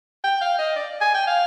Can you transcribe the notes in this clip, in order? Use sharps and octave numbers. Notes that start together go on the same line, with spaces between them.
G5
F5
D#5
D5
G#5
G5
F5